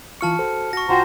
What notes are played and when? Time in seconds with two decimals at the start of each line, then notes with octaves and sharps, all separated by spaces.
0.21 E3 F4 A5 C#6 F6 C#7
0.39 F#4 A4 C5
0.73 F#4 C#6 A#6
0.89 C2 F4 F#4 C5 G5 A#5